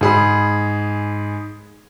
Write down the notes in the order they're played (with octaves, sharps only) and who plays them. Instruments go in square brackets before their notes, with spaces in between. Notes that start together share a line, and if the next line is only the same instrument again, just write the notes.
[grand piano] G#2 G#4 B5